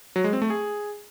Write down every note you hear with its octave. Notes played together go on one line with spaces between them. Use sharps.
F#3
G#3
C4
A3
G#4